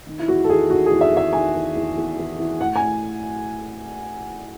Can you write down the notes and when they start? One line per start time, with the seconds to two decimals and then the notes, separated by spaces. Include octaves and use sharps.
0.07 D#3
0.19 E4
0.28 E2 F#4
0.44 A4
0.48 D#3 G#4
0.70 D#3 F#4
0.86 G#4
0.92 E2
1.01 E5
1.12 E2 E5
1.33 D#3 G#5
1.55 E2
1.75 E2
1.97 E2
2.18 E2
2.38 E2
2.60 A2 F#5
2.76 G#5
2.81 A2